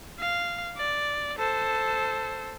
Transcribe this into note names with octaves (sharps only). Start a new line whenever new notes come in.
F5
D5
A4 C5